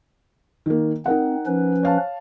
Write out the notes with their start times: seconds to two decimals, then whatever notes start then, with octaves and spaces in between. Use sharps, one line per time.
0.66 D#3 A#3
1.06 C4 D#4 A#4 F#5
1.46 F3 C#4 B4
1.83 C#5 F5 A5